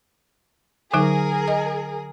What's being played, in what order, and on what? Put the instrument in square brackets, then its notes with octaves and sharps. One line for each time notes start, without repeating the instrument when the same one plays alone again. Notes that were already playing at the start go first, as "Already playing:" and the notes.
[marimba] D3 F#3 D#4 [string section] G#4 A#4
[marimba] D#5